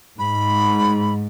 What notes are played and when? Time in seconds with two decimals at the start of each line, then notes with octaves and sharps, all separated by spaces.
0.19 G#2 B5